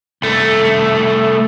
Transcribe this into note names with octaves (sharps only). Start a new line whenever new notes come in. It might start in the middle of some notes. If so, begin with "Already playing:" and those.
C2 A3